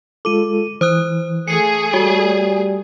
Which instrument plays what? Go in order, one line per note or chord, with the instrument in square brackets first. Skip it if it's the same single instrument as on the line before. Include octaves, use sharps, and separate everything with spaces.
[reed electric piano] G#3 F4 A4 [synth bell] D6 D#7
[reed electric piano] E3 [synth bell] C5 D#6 F#6
[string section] A3 G#4 [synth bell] C7 C#7
[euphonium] G3 [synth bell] F#4 [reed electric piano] C#5